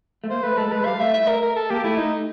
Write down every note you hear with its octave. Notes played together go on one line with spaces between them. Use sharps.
A3
A#3 C5
A3 B4
G#3 A4
G#3 B4
G3 F5
A3 E5
E5
A#4
A#4
A4
A#3 G4
A3 E4
D#4